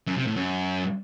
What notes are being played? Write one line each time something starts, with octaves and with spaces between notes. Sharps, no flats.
F#2
C3
A2
F#2